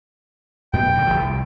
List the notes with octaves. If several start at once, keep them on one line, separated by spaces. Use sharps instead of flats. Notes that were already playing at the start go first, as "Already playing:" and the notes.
F#2 B2 B3 G5
G2 D3
E1 A#1 F3
C2